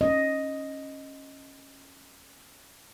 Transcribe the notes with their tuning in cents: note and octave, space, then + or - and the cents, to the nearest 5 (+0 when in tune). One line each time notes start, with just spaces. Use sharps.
C#4 -15 D#5 +0